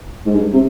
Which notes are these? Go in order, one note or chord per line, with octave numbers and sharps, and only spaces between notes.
G#2
G2
C3